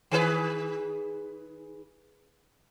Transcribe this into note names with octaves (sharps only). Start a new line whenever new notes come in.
D#3 G#4 B4